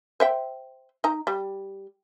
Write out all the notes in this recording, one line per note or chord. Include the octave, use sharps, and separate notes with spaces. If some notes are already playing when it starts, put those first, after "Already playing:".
C5 E5 G5
D#4 A#5
G3